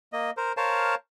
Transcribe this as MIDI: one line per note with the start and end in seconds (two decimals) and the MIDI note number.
0.13 0.31 58
0.13 0.31 75
0.37 0.52 70
0.37 0.52 72
0.57 0.95 70
0.57 0.95 72
0.57 0.95 73
0.57 0.95 77
0.57 0.95 81